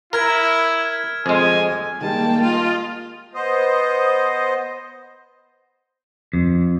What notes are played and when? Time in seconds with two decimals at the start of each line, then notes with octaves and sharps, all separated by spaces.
0.13 E4 A#4 F6 G#6
1.26 F2 G#3 G#5
2.01 D#3 G3 G#3 A#3 G5 A5
2.42 F4 D#5
3.33 B3 C5 D#5
6.33 F2